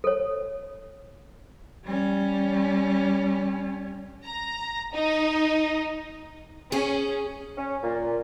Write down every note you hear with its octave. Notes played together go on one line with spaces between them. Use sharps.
A4 C#5
G3 C#4
A#5
D#4
C#4 G#4
C#4
A#2